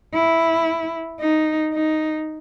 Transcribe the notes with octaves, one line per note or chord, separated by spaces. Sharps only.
E4
D#4
D#4